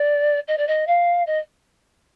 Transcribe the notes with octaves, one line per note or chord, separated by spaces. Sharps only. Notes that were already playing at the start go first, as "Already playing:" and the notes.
Already playing: D5
D#5
D5
D#5
F5
D#5